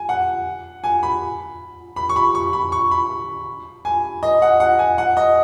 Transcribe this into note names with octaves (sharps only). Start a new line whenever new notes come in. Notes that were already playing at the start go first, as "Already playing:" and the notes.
Already playing: G#5
F#5
G#5
B5
B5
C#6
B5
C#6
B5
C#6
B5
G#5
D#5
F#5
F#5
G#5
F#5
D#5